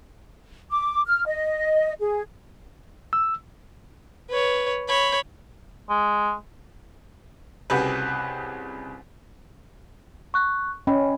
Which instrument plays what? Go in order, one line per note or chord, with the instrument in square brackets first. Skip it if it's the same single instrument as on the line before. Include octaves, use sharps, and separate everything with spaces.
[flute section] D6
F6
D#5
G#4
[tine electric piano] E6
[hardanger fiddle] B4 C#5
C#5 B5
[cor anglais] G#3
[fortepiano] C2 C#3 F#4 G4 B4
[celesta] C#6 F#6
[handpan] C#4 [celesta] D#5 G5 B5